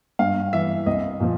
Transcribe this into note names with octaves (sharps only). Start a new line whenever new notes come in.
G2 F5
E3 E5
C2 D#5
A#2 F3